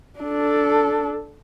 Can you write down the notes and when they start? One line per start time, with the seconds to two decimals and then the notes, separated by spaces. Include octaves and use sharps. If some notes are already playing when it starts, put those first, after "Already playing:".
0.19 D4 A4